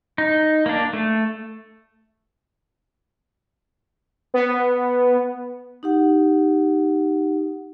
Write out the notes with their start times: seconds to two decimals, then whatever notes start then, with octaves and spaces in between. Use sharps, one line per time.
0.18 D#4
0.66 A#3 D4
0.93 A3
4.34 B3
5.83 D#4 G4 F#5